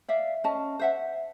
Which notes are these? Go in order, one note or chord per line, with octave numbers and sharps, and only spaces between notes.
D5 E5 F5
C#4 D#5 A5
C5 E5 F#5